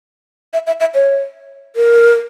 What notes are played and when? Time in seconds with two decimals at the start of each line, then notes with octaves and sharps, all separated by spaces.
0.53 E5
0.67 E5
0.80 E5
0.94 C#5
1.76 A#4